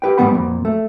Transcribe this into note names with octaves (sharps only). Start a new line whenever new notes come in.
G4 B4 G5
G#2 G3 G#3 B3 F#5 B5
F2 A#2
A3